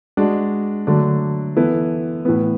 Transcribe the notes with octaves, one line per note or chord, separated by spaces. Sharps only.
G#3 D4 F#4
D3 F#3 A3 D4
E3 B3 E4 A4
A2 E3 B3